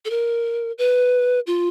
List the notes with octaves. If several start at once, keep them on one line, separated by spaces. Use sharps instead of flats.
A4
A#4
B4
F4